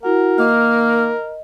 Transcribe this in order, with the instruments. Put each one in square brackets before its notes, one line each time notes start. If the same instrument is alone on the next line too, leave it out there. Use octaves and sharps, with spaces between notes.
[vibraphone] E4 F#4 F#5 [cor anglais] A#4
[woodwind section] D#3 A#3 [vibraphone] D#5 [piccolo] F6